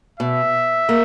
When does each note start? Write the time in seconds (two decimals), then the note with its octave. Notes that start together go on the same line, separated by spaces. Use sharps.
0.20 B2 E5
0.89 A#3